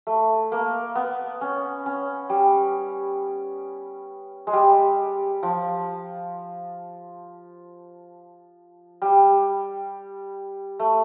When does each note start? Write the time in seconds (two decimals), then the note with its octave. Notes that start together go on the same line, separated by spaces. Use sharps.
0.07 A3
0.52 A#3
0.95 B3
1.41 C#4
1.86 C#4
2.30 G3
4.47 G#3
4.53 G3
5.43 F3
9.02 G3
10.79 A3